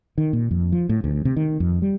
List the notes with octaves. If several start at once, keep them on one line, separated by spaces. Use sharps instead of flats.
D#3
A#2
F2
F3
A2
D2
C3
D#3
F2
G3